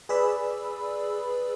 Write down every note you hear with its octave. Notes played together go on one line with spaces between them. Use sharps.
G#4 B4 D5 B5 E6